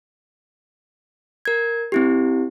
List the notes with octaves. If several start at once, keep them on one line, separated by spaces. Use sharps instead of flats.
A#4 G#6
C4 E4 G4